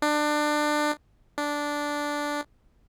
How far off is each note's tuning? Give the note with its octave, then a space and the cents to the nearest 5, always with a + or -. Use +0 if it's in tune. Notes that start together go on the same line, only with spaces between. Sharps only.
D4 +25
D4 -5